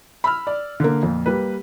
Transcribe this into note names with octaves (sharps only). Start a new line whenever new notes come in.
B5 E6 F6
D5
D3 A#3
F2 A#2
G3 A#3 B4